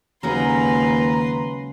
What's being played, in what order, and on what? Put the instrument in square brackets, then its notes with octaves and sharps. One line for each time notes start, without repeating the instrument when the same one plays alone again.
[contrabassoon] D#2 [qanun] C#3 F#3 G#3 [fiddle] B4 C6 [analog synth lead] A#5